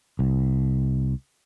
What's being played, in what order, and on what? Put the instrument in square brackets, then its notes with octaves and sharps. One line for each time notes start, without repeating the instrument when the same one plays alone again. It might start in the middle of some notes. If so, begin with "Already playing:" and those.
[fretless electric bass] C2